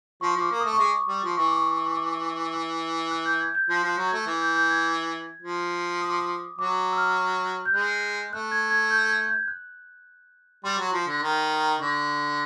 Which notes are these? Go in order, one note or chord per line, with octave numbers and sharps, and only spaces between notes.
F3 C#6
F3 D6
A#3
A3 D#6
C#6
G#3 D6
G3
F3
E3 C#6
D6
C#6
C#6
D6
E6
F#6
G6
G#6
G6
F3 G6
F3 F#6
F#3
A3 G#6
E3
G6
G6
G#6
F3
D#6
D6
D#6
F#3 D6
E6
F6
G6
G#3 F#6
A3 F#6
G#6
G#6
G6
G#6
G6
F#6
G3 C6
F#3
F3
D3
D#3
D3 C#6